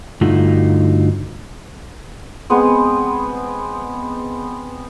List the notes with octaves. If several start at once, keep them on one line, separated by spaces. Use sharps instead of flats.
G2 D3 A3 D#4 F4 F#4
G#3 B3 C4 G#4